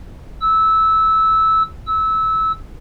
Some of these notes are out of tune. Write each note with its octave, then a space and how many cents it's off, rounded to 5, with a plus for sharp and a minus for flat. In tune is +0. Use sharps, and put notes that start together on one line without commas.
E6 -15
E6 -20